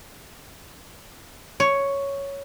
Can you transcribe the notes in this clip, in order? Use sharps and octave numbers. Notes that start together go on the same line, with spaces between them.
C#5